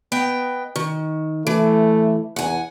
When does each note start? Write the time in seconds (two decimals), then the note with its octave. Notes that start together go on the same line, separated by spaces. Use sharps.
0.12 B3 D#5 G5
0.76 D#3
1.47 E3 A3
2.36 E2 F#5 G#5